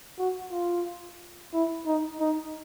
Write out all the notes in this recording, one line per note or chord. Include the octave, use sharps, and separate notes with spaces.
F#4
F4
E4
D#4
D#4